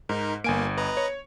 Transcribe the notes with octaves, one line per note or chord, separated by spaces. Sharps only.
G#2 D#4 A#4
G1 A#3 G#5 D7
B4 D#5 A#5
C#5